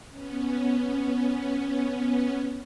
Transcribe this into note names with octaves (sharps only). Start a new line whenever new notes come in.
B3 C#4